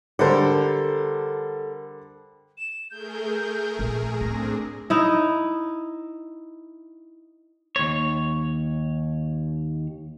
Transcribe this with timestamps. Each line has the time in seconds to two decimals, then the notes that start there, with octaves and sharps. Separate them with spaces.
0.19 D3 G3 A4 A#4 C5
2.58 E7
2.91 A3 G#4 A#4 G6
3.79 A#1
4.21 A2 C4 D4 G#4 A#6
4.90 D#4 E4
7.76 D#2 C#5